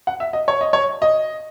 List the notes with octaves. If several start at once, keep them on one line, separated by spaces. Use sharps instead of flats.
F#5
E5
D#5
C#5
D#5
C#5
D#5